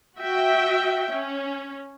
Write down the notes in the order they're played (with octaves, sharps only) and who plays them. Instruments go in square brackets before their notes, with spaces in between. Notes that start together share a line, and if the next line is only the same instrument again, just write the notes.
[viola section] F#4 E5 G5
C#4